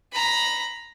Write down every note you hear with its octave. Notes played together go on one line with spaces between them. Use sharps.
A#5 B5